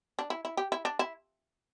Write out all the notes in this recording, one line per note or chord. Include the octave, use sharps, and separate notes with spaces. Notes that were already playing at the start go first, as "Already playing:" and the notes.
D4
E4
E4
G4
E4
D4
E4